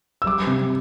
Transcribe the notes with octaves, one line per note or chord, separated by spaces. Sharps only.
E6
G3 D6
C3